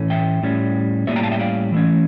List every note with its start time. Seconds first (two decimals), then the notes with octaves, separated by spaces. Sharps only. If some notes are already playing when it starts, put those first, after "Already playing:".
Already playing: A2 E3 A3 C#4
0.10 E5 G5
0.43 A2 G3 C#4
1.07 A2 G3 A#3 C#4 C#5 E5
1.16 G5 A#5
1.23 F5 A5
1.31 E5 G5
1.40 D5 F5
1.72 E3 A3 C#4